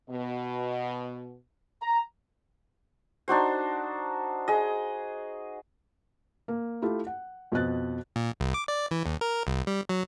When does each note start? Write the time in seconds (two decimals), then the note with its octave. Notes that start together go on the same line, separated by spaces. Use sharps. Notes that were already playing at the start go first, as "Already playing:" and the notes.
0.10 B2
1.82 A#5
3.28 D4 D#4 F#4 C5
4.48 G#4 D#5
6.48 A#3
6.82 A3 E4 F4 G4
7.07 F#5
7.52 F2 B2 D#5 F#6 A6
8.16 A#2
8.40 C2
8.54 D6
8.68 D5
8.91 E3
9.06 D#2
9.21 A#4
9.47 C2
9.67 G3
9.89 F#3